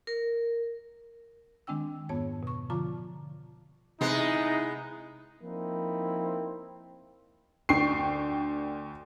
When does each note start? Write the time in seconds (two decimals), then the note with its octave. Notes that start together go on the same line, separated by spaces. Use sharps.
0.07 A#4
1.67 D#3 G#3 C4 D4 G5 E6
2.09 F2 G#2 B3 C#5 A5
2.43 B2 C#6
2.70 D3 F3 F4 A5 A#5 D6
4.01 C3 G#3 B3 D#4 E4
5.42 F3 A#3 C4 D#4 E4
7.69 D2 G5 C#6 C7